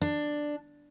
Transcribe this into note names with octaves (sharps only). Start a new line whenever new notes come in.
D4